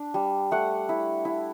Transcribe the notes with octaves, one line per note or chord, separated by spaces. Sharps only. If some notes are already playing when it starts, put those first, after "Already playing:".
Already playing: D4
G3
A3 F#5
E4
E4